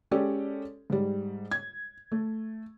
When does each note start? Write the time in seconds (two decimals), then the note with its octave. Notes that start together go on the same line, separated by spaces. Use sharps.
0.11 G#3 C#4 G4 A4 D5
0.90 G#2 G3
1.51 G#6
2.12 A3